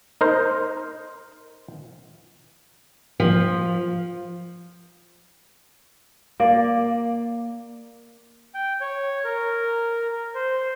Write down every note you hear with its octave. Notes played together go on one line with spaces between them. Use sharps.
D#4 A#4 C5
F3
A#3 D5
G5
C#5
A#4
C5